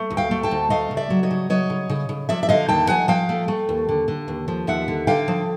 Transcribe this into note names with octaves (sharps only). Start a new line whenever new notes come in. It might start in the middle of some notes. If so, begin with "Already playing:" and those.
Already playing: A3
D2
F5 G5
A3
G5 A5
D2
A3 D#5 F5
C#3
D5 E5
F#3
C#5 D#5
C#3
F#3 C#5 D#5
C#3
C#3
C#3
F3 D5 E5
E5
D3 D#5 F5
D#2 G5 A5
F3 F#5 G#5
F3 F5 G5
A3
A3
D#2
D3
D3
D#2
F3
D#2 E5 F#5
D3
D3 F5 G5
F3